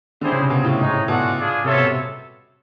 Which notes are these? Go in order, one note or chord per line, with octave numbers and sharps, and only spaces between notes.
D3 G3 C4 E4 G#4 C5
C#3
C3
B2 C4 F4 G#4
A2
G#2 G#3 C4 D#4 G#4 C#5
A2
B2 C#4 F4 A4 D5 F#5
D4 F4 G#4
C3 F4 A4 C#5 E5
B2
C3